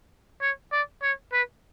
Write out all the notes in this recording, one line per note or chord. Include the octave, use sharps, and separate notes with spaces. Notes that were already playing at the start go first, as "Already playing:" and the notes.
C#5
D5
C#5
B4